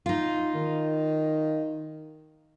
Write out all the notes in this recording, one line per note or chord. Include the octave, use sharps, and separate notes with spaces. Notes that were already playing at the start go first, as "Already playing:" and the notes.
D#4 F4
D#3